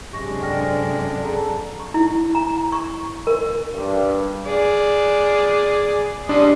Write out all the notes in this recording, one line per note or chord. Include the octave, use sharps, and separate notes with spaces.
F#2 C3 G#3 D4 G4 C#6 A#6
D3 G5 F6 A#6
G#4 A4 A#5
C#6
E4
A#5
C#6
A#4
G2
G#4 D5
G3 D4 D#5 C6